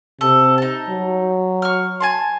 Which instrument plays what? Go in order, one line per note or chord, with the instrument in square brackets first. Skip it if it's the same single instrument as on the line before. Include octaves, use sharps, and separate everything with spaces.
[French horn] C3 [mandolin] A4
[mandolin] D#4 A5
[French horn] F#3
[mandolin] C#6 F6
G#5 A5 C6